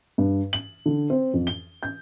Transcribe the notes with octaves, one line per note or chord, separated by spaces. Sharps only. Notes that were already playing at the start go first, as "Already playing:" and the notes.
G2
F#7
D3
C4
F2
G7
G6